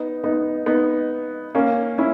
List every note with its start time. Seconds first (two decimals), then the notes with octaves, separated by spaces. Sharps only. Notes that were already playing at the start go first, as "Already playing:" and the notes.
Already playing: B3 D#4
0.24 B3 D#4
0.66 B3 D#4
1.55 A#3 C#4
1.98 C#4 E4